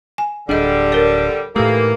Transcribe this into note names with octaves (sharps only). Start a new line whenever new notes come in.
G#5
D1 G1 D3 G3 D4 G#4 D#5
A#4 C#5 D5
A2 D#3 E3 A3 A#3 G4 A4